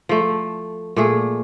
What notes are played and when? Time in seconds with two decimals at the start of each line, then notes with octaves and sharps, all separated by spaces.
0.09 F3 A3
0.96 A#2 A3 G#4